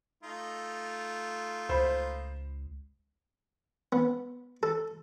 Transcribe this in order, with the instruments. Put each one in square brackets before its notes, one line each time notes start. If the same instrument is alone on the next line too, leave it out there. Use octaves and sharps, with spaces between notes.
[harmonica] A3 D#4 F4
[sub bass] C#2 [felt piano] C5 B5
[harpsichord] B3
A4